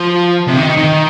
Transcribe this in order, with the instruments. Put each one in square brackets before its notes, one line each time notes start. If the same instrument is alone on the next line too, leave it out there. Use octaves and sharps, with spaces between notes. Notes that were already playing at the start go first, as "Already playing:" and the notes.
Already playing: [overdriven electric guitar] F3
C3
D#3
D#3